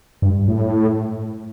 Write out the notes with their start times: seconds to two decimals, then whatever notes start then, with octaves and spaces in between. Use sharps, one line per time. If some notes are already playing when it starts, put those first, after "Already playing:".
0.22 G2
0.48 A2